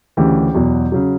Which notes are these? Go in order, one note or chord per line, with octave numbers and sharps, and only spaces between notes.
D2 C#3 E3 G4
E2 B2 F#3
C#3 F#3